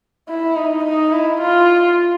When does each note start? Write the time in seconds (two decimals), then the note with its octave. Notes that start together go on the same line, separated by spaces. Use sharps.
0.29 E4
0.56 D#4
0.84 D#4
1.12 E4
1.41 F4